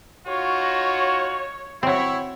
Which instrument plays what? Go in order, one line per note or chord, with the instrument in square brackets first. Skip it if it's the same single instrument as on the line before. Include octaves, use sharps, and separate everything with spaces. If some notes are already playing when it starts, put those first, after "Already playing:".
[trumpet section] D#4 F4 F#4 [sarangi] C#5
[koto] F#3 C4 [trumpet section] E4 C#5